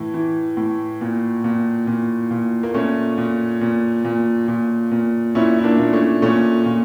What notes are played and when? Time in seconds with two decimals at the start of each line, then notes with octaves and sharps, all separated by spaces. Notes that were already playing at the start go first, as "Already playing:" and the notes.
Already playing: A2 E3
0.14 E3
0.57 A2
1.01 A#2
1.44 A#2
1.87 A#2
2.31 A#2
2.63 A#3
2.74 A#2 A3 C#4
3.18 A#2
3.61 A#2
4.04 A#2
4.48 A#2
4.91 A#2
5.35 A#2 C#4 E4
5.59 E4
5.64 A#3 D4
5.79 A#2
5.93 A3 C#4
6.22 A#2 A3 C#4
6.66 A#2